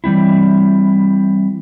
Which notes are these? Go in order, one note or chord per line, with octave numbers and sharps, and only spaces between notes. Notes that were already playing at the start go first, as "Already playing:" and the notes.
E3 G3 C4 E4